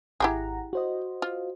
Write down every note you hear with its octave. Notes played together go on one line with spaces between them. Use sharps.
G#1 E4 G4 G#4 F#5 A#5
F#4 C5 D#5
F4